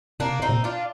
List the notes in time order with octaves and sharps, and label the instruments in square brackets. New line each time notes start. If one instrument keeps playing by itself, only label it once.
[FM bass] C3 [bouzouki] A#3 D4
[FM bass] C3 [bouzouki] C4 D#4
[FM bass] A#2
[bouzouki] D4 F4